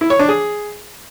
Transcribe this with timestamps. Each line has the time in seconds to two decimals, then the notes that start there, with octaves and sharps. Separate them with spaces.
0.01 E4
0.10 C#5
0.19 D4
0.29 G#4